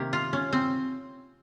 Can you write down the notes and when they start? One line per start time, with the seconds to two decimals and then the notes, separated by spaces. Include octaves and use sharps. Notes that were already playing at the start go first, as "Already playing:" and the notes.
Already playing: C3 D#3 A#3 G4
0.13 F4
0.33 C#4
0.53 C4